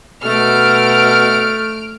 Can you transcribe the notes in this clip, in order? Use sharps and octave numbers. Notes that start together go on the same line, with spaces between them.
B2 A3 F6 D7